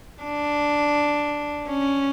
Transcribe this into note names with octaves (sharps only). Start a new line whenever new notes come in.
D4
C#4